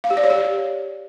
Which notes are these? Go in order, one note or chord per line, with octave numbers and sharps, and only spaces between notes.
F5
G4
D5
C#5
G4